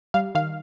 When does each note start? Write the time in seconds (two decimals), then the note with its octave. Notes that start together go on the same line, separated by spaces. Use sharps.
0.14 G3 F5
0.35 D#3 F5